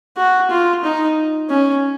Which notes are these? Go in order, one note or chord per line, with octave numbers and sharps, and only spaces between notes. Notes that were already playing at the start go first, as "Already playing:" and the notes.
F#4
F4
D#4
C#4